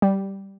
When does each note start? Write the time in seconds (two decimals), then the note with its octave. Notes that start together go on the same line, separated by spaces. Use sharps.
0.02 G3